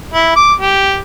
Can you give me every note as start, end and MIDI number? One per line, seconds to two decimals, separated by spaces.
0.14 0.33 64
0.36 0.53 86
0.60 0.99 67